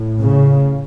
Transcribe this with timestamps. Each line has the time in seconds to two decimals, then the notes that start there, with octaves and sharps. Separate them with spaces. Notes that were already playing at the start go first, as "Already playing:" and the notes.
Already playing: A2
0.23 C#3